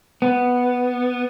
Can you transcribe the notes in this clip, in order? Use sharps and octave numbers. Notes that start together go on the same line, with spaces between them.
B3